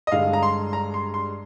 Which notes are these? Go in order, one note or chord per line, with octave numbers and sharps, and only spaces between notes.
D#5
G2 D3 G#3 F5
A#5
C6
A#5
C6
C6